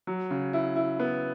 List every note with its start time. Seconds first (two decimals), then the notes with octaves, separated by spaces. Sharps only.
0.07 F#3
0.31 C#3
0.53 E4
0.76 E4
1.00 B3